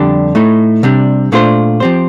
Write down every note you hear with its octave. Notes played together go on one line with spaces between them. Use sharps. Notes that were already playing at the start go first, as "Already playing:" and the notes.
Already playing: F2 D3 G3 D4 G4
A2 A3 D#4
C3 G3 D4
A#2 A3 D4 F4 C5
F3 C4 G4 C5